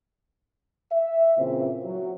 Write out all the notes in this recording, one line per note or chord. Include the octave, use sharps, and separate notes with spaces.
E5
A#2 C#3 E3 C4
F#3